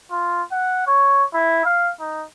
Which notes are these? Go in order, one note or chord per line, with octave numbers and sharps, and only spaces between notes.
F4
F#5
C#5
E4
F5
D#4